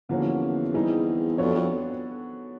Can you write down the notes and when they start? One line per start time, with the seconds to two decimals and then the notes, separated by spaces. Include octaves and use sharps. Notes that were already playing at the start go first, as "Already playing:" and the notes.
0.09 E2 D3 F3 A#3 C#4 F#4
0.74 E3 G3 C4 D#4 G#4
1.38 F2 B3 D4 F#4 A4 C#5
1.55 F2